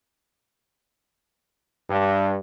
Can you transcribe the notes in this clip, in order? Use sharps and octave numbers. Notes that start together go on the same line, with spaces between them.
G2